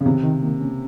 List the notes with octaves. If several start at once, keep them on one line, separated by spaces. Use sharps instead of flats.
C#3
C3 D#3
D#3
A#3
C#4